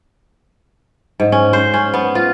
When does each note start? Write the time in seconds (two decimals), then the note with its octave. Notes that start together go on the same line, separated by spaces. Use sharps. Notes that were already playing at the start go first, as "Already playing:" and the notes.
1.20 G#2
1.32 C#4
1.53 C5
1.74 C#4
1.94 B3
2.15 F4